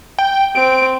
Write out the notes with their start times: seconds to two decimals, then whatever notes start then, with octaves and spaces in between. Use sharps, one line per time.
0.18 G5
0.55 C4 D7